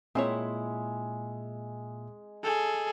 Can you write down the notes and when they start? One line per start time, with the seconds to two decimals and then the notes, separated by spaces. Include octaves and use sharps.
0.15 A#2 G#3 C4 E4 C#5 E5
2.43 G#4 A4